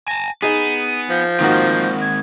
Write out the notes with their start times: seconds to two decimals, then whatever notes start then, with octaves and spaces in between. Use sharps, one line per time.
0.08 G#5 A5 A#6
0.42 B3 D#4 G#4 D#7
1.10 F3 G6
1.40 D#3 G#3 A#3 C4 F#4
2.02 G#6